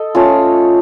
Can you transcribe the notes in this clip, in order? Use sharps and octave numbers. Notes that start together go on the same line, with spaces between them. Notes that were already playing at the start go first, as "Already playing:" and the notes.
Already playing: A4 D#5
A3 C#4 F4